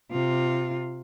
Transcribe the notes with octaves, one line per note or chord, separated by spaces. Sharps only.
C3 F4